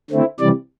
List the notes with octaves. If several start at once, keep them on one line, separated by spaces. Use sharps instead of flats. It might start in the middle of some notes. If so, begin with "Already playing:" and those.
D3 A3 C4 E4
C3 E3 G3 D5